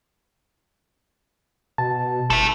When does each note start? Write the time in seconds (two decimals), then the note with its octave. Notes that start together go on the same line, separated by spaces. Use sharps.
1.78 B2 A5
2.30 G1 E4 A4